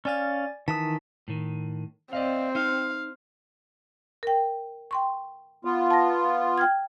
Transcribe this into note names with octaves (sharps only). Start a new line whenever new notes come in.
C#4 D5 F5 G#5 A6
D#3 E3 A5 D#6 B6
A2 D#3
C4 D5 D#5 F5
D#4 F5
A#4 G5
G5 C6 C#6
B3 F4
A5 A#6
G5 F6 G#6